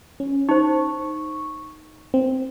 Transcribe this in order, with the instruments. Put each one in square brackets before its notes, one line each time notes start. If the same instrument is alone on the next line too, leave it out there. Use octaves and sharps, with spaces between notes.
[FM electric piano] C#4
[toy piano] D#4 C5 [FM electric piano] C#6
[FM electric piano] C4